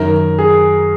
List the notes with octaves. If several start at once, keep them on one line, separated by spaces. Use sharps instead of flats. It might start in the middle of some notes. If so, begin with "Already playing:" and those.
Already playing: F#2 D#3 A#4
G#4